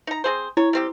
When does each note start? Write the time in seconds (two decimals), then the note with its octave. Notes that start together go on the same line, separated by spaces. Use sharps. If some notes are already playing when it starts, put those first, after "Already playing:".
0.07 D#4 A#5
0.24 C4 G#4 C5
0.57 E4 C#5
0.73 G3 C4 G4